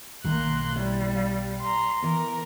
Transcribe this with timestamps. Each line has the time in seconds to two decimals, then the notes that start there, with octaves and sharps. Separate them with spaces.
0.24 B1 B2 D#3 A#3 C6 F#6
0.76 G3 E4 C#5 E5
1.16 F5
1.61 A#5 C6
2.02 E3 B3 A#4